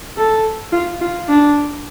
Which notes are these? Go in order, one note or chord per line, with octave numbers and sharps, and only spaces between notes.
A4
F4
F4
D4